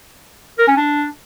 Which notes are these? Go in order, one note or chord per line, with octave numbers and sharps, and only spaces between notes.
A#4
C#4
D4